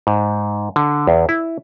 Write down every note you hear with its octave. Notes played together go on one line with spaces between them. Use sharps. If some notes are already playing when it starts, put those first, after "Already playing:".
G#2
D3
E2
E4